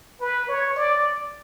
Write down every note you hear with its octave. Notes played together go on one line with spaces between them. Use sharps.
B4
C#5
D5